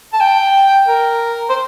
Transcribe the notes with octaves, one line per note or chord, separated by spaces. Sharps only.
A5
G5
A#4
C5